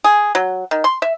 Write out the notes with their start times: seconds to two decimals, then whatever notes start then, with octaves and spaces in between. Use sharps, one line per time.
0.04 G#4
0.35 F#3
0.71 D#3
0.84 C6
1.02 E5